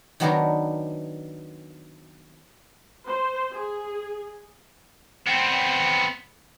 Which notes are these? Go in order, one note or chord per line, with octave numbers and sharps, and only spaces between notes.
D#3 F#3 B3 D4 F#4 A#4
C5
G#4
B3 C4